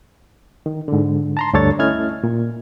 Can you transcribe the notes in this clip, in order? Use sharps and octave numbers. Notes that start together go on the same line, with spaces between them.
D#3
G#2 D3
A5 A#5 C6
D2 G2 D4 A4 C#5 A6
A3 C#4 E4 D#5 F6 G#6
A#2